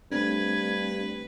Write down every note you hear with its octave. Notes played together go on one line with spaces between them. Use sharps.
G2 A3 C4 D4 B4 G#6